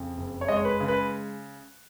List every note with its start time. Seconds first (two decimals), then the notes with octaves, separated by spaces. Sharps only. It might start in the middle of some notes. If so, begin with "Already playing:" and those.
Already playing: F2 C#3
0.17 F#1
0.41 C#5
0.48 G#3 D#5
0.56 C#5
0.65 B4
0.80 C#3
0.88 B4